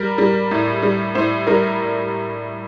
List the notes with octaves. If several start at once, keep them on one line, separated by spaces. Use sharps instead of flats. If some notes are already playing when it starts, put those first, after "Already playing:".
Already playing: G3 A#4
G3
A2
G3
A2 C5
G3 A#4